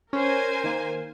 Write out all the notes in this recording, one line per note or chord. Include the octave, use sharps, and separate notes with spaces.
C#4 A#4 C5 G#5
D#3 A#3